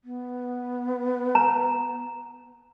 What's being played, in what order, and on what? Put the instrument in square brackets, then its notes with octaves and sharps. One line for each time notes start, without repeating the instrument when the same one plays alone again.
[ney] B3
[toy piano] A#5